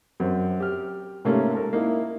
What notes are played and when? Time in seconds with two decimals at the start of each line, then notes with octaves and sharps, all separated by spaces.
0.20 F#2 C4
0.60 G4 F6
1.25 G#2 C3 A3 A#3 C#4
1.55 A4 A#4
1.73 A#3 D#4 E4